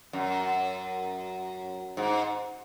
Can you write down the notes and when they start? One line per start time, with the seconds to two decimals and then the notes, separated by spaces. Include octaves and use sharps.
0.13 F#2
1.97 G#2